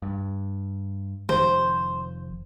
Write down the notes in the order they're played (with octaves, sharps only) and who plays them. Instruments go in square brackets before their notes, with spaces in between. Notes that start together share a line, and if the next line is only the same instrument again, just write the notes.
[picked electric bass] G2
[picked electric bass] F1 D#3 F3 [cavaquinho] C5